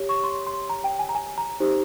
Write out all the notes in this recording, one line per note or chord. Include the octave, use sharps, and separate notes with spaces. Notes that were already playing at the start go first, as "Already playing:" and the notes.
Already playing: G4 C#5
C#6
C6
C6
A#5
G5
G#5
A#5
G#5
A#5
D#4 G4 C5